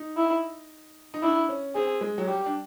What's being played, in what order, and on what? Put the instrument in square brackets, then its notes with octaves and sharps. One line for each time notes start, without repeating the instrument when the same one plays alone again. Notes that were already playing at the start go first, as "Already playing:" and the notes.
Already playing: [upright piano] D#4
[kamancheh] E4
[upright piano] D#4
[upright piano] D4 [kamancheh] E4
[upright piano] C#4
[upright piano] C4 [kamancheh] G#4
[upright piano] G#3
F#3
[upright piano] G3 [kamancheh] G4
[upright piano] D4